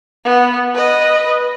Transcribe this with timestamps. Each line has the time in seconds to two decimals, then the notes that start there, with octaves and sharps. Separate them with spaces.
0.24 B3
0.74 B4 D#5